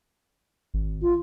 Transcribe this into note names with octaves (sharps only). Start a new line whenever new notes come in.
G#1
F4